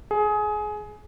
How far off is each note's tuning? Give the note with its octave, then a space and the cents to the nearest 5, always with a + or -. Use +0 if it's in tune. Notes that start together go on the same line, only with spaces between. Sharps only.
G#4 +20